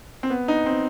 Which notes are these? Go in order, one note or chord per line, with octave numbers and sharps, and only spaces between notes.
C4
B3
D#4
C4